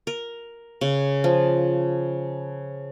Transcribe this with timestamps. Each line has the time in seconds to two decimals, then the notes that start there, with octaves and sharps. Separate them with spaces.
0.07 A#4
0.81 C#3
1.24 F3